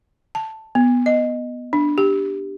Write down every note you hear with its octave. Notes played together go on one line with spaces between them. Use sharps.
A5
B3
D#5
D4
G4